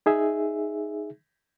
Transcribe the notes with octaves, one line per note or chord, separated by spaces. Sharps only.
D#4 G#4 E5